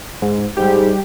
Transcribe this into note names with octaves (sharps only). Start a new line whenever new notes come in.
G#2
G#2 G3 G4